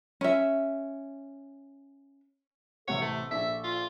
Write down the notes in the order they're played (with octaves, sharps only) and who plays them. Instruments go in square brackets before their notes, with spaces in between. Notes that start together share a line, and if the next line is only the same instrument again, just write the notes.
[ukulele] C#4 E5
[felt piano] A1 C3 F#5 [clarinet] A4 [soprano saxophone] C#5
[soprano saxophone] A3
[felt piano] A#1 [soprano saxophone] E5
[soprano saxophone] F4